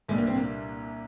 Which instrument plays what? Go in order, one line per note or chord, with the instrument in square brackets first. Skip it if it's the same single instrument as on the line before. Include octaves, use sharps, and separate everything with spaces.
[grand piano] C2 A#2 G3 D4 [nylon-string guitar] G#3
[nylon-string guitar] A#3
C4
A#3